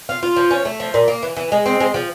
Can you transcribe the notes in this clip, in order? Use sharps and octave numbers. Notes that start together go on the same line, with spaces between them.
F4
F4
F3
C#4
A3
F3
A#2
A#3
E3
E3
G#3
C4
G#3
F3